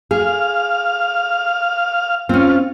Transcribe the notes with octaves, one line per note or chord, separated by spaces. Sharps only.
G#4 F5
C4 C#4 F4